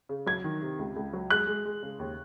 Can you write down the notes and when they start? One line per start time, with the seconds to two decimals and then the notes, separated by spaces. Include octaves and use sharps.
0.09 C#3
0.26 F#3 G#6
0.44 D#3
0.62 C3
0.79 C#2
0.96 C#2
1.13 F#3
1.30 G#3 F#6
1.47 G#3
1.65 G#3
1.83 C#3
1.99 D#2